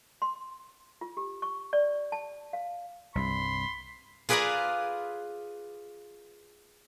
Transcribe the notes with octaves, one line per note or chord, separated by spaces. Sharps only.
C6
F4
G4
C#6
D5
A5
F5
C2 G2 B5 C6
F4 G#4 B4 D5 G#5 A#5